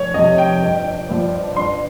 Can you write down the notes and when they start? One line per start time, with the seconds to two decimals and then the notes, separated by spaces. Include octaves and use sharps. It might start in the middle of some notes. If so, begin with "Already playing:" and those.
Already playing: F1 C#5
0.14 F2 C3 D#5
0.38 G5
0.62 G1
1.09 G2 F3
1.56 G1 C6